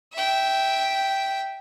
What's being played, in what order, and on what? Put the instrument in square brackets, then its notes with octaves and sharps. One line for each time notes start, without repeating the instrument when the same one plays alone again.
[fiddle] E5 G5